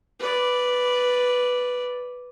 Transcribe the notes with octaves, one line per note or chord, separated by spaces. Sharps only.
B4 D5